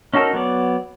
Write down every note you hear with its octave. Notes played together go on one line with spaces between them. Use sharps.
C#4 D#4 F#4 A4 A#4
F#3 B3 D5